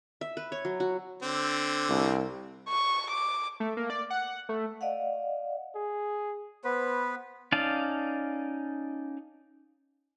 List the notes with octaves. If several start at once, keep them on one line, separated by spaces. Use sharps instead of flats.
E5
B4
C#5
F#3
F#4
D3 C4
C2
C#6
D6
A3
A#3
D5
F#5
A3
D5 D#5 F5 F#5
G#4
B3 B4 C5
C#4 D#4 D5 F5 A5